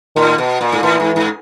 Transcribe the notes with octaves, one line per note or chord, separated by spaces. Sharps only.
A2 D#3
B2
A#2
G#2
A2 E3
G#2
G#2